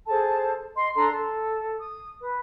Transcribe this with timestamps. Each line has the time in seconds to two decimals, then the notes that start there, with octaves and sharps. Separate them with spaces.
0.07 G#4 A4 C5 A5
0.76 D#5 C6
0.95 D4 A4 A#5 C6
1.11 A4
1.80 D#6
2.19 B4